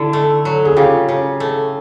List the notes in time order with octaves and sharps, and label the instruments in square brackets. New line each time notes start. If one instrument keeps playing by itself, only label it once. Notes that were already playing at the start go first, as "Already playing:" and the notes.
Already playing: [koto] D3 [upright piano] E4
[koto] A3
F#3
[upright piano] G#4
[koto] C#3 [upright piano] F4 G4
[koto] C#3
A3